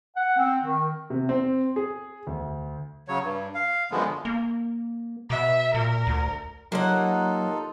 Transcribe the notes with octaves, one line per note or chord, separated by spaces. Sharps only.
F#5
C4
D#3
C3
C4
G#4
D2
C#3 F#3 C#5
G2
F5
F#2 D3 F3 G#3 B3
A#3
B2 E5
A#2 A#4
D2
F#3 A#3 D#4 F4 G4 A4 C#5 F#5